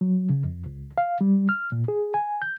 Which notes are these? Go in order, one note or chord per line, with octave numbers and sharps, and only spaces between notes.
F#3
C#3
F2
C#2
F5
G3
F6
A#2
G#4
G#5
G6